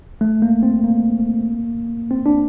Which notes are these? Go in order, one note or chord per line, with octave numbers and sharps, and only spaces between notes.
A3
A#3
C4
A#3
C4
D4